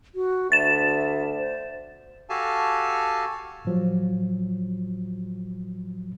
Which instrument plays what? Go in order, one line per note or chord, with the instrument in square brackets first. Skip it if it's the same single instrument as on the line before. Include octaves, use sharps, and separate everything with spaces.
[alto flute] F#4
[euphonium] D2 [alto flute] E5 [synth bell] A6 E7
[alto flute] C5
[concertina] F#4 G4 A4 F5 G#5 A5
[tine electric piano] A2 F3 F#3